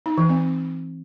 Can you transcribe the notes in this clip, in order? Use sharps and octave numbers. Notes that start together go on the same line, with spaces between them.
D#4
E3
C4